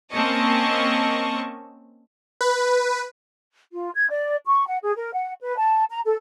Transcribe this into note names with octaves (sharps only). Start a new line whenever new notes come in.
A#3 C4 C#4 D#5 A5 C#6
B4
F4
G#6
D5
C#6
F#5
G#4
A#4
F#5
B4
A5
A#5
A4